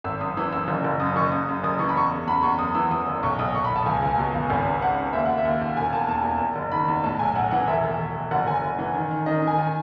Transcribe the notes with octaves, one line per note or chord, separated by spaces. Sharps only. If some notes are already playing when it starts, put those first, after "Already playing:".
G#1 E6
F#2 D#6
E3 E6
F#2 E6
F#1
F#1
F#2 D#6
F#1 C#6
C#3 D#6
F#2
F#1 D#6
E3 C#6
B5
E2 C#6
C#3
E2 B5
E2 C#6
F#2 D#6
E3 E6
E3 D#6
F#1
B1 C#6
B1 D#6
B1 C#6
B5
B1
A5
C#2 G#5
G#5
C#2
G#5
B2
C#2
G#1
C#3
C#3 F#5
C#3
D#2 E5
D#2 F#5
E5
D#2
D#2
E1 G#5
E2 A5
E2 A5
E2
E2
F#1
D#3 B5
E2
A2 A5
B1 G#5
B1 F#5
E3 F#5
E1 E5
E1
E1
E1
F#1 F#5
F#1 G#5
F#1
E3
D#3
D#3
D#3 D#5
D#3
G#5
D#3 G#5